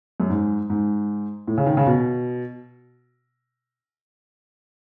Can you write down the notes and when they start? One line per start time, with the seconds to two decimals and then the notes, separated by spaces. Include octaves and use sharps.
0.20 F#2
0.30 G#2
0.70 G#2
1.47 A2
1.58 C#3
1.66 D#3
1.77 C#3
1.87 B2